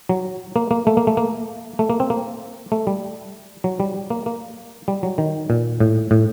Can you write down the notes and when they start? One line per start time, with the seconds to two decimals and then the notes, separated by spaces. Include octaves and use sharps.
0.09 F#3
0.56 A#3
0.71 A#3
0.87 A3
0.97 A#3
1.07 A3
1.17 A#3
1.79 A3
1.90 A#3
2.00 C4
2.10 A#3
2.72 A3
2.87 G3
3.64 F#3
3.80 G3
4.10 A#3
4.26 A#3
4.88 G3
5.03 F#3
5.18 D#3
5.50 A#2
5.80 A2
6.11 A2